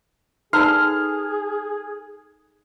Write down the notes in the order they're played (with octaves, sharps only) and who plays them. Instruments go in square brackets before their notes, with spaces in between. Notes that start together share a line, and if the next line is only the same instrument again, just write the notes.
[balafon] D#4 B4 [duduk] G#4 [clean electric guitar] A4 [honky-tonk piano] F6